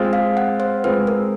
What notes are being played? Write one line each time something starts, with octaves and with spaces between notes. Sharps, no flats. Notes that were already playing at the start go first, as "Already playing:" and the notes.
Already playing: G#3 C4 F4
F5
F#5
C5
G#3 C4 F4 B4
A#4